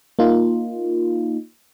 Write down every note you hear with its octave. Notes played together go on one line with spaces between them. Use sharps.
A#3 D#4 F4